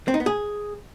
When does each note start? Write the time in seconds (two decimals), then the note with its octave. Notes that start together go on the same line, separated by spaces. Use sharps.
0.08 C4
0.14 D#4
0.20 B3
0.26 G#4